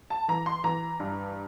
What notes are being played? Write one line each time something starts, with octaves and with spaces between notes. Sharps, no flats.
A5
E3 A#5
C6
E3 A#5
G2